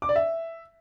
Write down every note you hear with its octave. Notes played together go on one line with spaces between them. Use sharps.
D6
D5
E5